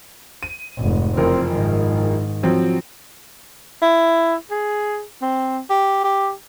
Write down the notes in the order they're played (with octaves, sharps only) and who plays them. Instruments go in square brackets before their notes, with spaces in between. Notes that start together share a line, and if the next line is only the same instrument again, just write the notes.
[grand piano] D#7
[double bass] F1 G#2
[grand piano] F#1 F3 A#4 [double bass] C4
[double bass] G#2 D#3
[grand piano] F3 F#3 C4
[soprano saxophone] E4
G#4
C4
G4
G4